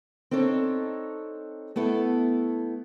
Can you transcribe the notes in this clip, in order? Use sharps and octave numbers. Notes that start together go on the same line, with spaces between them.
C4 D4 D#4 A4 C#5
A3 B3 E4 A4